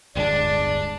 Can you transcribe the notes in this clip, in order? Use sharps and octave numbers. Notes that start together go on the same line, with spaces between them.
D1 G1 G#3 D4 D5